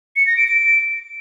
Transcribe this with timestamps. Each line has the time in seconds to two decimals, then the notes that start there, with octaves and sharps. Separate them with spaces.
0.16 C#7
0.27 A#6
0.37 D7
0.48 D7